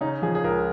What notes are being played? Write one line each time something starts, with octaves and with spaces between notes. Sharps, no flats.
C#3 D#4
F3 G#4
G#4
C#2 A#4